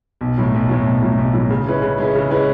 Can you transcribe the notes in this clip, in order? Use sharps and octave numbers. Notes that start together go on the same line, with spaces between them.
B1
A2 F#3
B1
A2 F#3
B1
A2 F#3
B1
A2 F#3
C#3
G#3 C#4 E4 B4
C#3
G#3 C#4 E4 B4
C#3
G#3 C#4 E4 B4